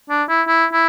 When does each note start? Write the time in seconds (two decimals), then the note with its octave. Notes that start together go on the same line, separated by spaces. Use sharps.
0.10 D4
0.29 E4
0.48 E4
0.73 E4